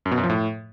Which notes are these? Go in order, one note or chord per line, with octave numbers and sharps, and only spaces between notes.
F#2
B2
F#2
F3
A2